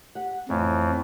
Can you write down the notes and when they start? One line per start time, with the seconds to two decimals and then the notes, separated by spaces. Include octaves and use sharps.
0.15 G4 F#5
0.49 F2 A2 E3